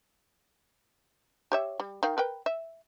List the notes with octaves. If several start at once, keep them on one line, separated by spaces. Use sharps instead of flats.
G4 C#5 E5
G3
D#3 F5
A#4 B4 G5
E5